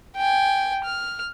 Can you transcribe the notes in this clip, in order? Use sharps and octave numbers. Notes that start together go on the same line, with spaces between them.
G5 G#5
F6